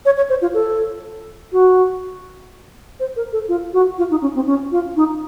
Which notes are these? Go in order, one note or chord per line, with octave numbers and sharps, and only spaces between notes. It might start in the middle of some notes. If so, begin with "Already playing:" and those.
C#5
C#5
C5
F4
A4
F#4
C5
A#4
A4
F4
F#4
F4
D#4
C#4
C4
C#4
F4
D#4